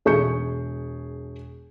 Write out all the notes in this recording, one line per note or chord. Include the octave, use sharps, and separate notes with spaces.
E1 G#4 C#6 G6 C#7